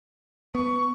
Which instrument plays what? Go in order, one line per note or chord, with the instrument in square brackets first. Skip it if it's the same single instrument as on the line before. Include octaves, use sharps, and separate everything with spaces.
[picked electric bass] B3 [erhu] C#6